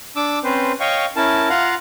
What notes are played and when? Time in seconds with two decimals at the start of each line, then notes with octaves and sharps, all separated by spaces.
0.16 D4 D6 E6
0.44 C4 C#4 B4 C5
0.80 C#5 D#5 F5 G5 C#6
1.16 C#4 E4 A#4 A5
1.50 F4 F5 F#5 A#5